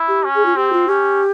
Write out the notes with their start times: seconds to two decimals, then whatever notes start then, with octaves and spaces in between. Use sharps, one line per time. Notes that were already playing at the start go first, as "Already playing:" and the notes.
Already playing: E4
0.08 G4
0.25 C#4
0.35 G#4
0.46 F4
0.56 C4 G4
0.73 F4
0.88 C#4 G4